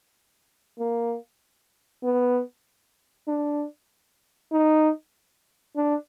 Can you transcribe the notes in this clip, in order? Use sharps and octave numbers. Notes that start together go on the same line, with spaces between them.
A#3
B3
D4
D#4
D4